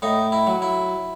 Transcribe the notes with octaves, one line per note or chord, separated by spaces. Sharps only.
A2 D#4
E4
F#3
E4